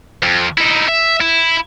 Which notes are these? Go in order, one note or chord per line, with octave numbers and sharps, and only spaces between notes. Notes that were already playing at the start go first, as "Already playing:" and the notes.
F2
D#4 E4
E5
E4